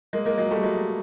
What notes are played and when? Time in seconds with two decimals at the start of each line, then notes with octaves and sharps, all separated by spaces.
0.13 G#3 A#3
0.25 G#3 A#3
0.38 F#3 G#3
0.51 G3 A3
0.63 F#3 G#3